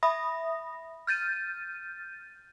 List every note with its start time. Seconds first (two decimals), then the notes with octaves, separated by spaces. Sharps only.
0.03 E5 B5 D#6 A#6
1.07 F6 G6 A6 D#7